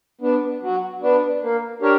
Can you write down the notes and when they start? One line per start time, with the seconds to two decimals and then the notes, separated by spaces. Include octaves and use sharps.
0.21 B3 D4
0.62 F#3
1.02 B3 D4
1.42 A#3
1.82 D4 G4 A#4 C#5